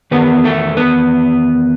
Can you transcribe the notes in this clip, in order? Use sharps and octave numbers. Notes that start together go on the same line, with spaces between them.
E2 D#3 B3 B4
A3 A4
B3 B4